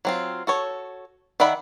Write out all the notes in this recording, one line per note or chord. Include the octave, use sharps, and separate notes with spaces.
F#3 C4 F4
F#4 A4 C#5
D#3 D5 E5 F#5 B5